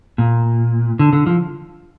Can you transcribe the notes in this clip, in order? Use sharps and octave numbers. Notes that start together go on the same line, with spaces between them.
A#2
D3
D3
F3